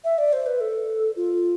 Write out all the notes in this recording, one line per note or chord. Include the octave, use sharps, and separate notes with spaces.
E5
D5
C5
B4
A4
F4